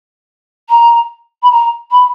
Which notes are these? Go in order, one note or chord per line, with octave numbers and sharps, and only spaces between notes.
A#5
B5
A#5
B5